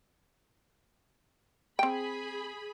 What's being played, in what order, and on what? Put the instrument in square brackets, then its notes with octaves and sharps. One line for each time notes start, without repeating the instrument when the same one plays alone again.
[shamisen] C4 G5 [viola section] G#4 B5